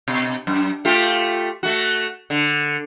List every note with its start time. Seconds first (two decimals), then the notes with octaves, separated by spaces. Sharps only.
0.08 B2
0.47 F#2
0.85 A3 F4 G4
1.63 A3 F#4
2.30 D3